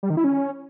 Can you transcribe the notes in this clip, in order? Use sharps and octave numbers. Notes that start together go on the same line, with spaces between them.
G3
D#3
E4
C#4